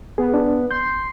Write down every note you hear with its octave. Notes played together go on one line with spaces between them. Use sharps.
B3 G#4
D4
C6 G6